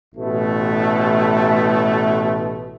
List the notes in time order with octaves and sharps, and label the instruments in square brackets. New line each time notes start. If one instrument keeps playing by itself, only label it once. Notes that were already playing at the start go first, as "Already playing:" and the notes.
[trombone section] A1 B2 A3